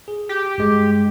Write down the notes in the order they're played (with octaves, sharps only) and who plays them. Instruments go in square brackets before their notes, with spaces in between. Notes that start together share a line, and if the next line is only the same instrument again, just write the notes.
[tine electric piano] G#4
[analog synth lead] G4
[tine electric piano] G2 G#3